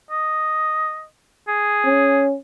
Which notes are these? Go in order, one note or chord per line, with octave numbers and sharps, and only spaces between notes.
D#5
G#4
C#4